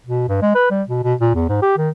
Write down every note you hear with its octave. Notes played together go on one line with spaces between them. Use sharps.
B2
G2
G#3
B4
G3
B2
B2
A#2
E2
G#2
G4
D#3